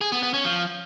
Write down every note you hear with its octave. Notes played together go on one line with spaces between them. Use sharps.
G#4
B3
B3
C#4
F3